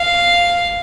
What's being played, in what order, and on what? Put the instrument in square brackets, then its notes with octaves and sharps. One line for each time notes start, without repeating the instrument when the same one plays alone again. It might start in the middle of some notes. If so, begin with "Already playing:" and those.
Already playing: [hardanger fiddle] F5